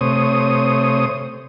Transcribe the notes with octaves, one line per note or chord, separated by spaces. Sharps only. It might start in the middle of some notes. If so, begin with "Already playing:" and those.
C3 A3 C5 C#5 D#6